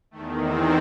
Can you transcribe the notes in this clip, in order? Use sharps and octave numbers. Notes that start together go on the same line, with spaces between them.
E2 D#3 A3
C4